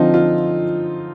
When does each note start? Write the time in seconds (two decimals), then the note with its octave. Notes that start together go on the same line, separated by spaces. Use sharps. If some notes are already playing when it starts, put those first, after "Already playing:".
Already playing: D3 F3 C4 D#4 F4
0.14 F4